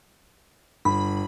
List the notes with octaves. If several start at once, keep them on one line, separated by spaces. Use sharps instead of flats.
G1 B5